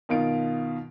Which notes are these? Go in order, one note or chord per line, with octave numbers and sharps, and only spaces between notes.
B2 D#3 F4 D7